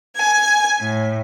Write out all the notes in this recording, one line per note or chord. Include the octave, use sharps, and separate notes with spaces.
G#5
A2